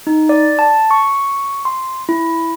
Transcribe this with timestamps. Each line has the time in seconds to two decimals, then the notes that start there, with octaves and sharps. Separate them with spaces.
0.07 D#4
0.29 D5
0.59 A5
0.91 C#6
1.65 C6
2.09 E4